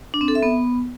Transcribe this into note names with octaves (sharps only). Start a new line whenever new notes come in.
D4
C4
A4
E5
B3